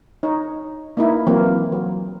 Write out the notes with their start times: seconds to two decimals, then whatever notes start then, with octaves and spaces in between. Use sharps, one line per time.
0.23 D#4 C#5
0.97 A#3 D#4 E4
1.27 E3 F#3 A#3 C4
1.72 F#3